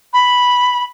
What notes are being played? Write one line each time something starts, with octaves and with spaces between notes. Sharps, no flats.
B5